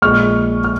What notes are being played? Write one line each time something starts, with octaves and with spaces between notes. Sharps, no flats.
A#1 A#2 G#3 C#6 F6
F6